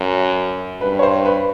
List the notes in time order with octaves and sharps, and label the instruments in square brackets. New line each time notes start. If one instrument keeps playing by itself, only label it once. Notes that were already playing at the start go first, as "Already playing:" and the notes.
Already playing: [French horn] F#2
[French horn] G2 [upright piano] B4
[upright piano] C#5
C5
B4